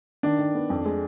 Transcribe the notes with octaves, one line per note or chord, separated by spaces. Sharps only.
D#3 D4
D#3
B3
F2
G#3